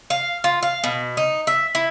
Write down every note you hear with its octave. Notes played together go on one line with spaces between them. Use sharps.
F5
F4
F5
B2
D#4
E5
E4